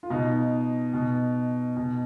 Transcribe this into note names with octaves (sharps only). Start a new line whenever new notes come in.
F4
B2 D#4
B2
B2